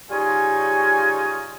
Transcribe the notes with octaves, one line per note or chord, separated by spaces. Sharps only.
C#3 G3 C#4 D#4 F4 G#5